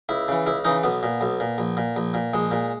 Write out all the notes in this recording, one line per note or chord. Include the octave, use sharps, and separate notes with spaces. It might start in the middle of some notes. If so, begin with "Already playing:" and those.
C#2 E4
C#3 E3
C#2 E4
C#3 E3 D#4
B1 B3
A#2
B1
A#2
A#1
A#2
A#1
A#2
A#1 G#3
A#2